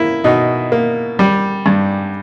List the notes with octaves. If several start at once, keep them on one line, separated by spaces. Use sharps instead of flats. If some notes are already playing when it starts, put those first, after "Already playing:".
Already playing: A#3 E4
B2 D#4
A#3
G3
G2